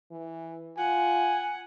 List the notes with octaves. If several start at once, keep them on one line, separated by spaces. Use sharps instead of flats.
E3
F4 F#5 G#5